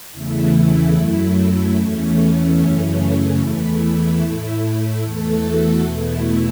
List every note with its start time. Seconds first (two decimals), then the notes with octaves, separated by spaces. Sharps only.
0.12 E2 C#3 E3 A3 E4
0.94 F#2 F#3 A3
1.76 E2 E3 A3 C#4
2.57 F#2 C#3 E3 A3
3.39 E2 E3 A3 E4
4.20 A2 A3
5.01 E2 E3 A3 A4
5.42 F#4
5.83 E2 B2 A3 E4